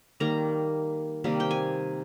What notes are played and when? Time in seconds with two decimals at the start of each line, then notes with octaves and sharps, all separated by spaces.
0.20 D#3 G3 A#3 A#5
1.24 C3 D#3 G3 A#3
1.40 G5
1.51 G#5